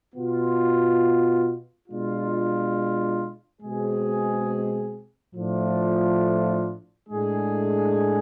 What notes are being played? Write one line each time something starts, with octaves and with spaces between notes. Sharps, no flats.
B2 B3 F4
B2 G#3 D4 F4
B2 G#3 C4 G#4
A2 F3 A3 D4 F4
A2 G#3 D4 G#4